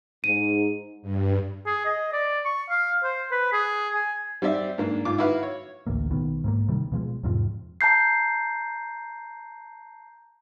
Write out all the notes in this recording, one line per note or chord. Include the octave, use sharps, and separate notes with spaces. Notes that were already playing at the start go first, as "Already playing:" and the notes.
G#2 D#7
G2
G#4
D#5
D5
C#6
F5
C5
B4
G#4
G#5
G3 C4 D5 E5
G#2 A#3 D4
G#2 F4 D6
E4 F#4 B4 F5
C#5
A1 D2 A#3
B1 D#3 B3
G#2 G#3 A#3
C3 D#3 G3
B2 F3 G#3
E2 G#2 C3 F3
A5 A#5 G6 C7